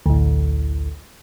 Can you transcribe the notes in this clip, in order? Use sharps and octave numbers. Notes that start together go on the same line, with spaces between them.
A1 D2